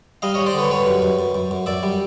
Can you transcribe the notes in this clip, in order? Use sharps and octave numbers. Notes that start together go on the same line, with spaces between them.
G3 D#5 F5
G3 C#5 D#5
C5 D5
D3 B4 C#5
G3 B4 C#5
F#2
F#2
F#2
F#2
F#2
F#2 D5 E5
G3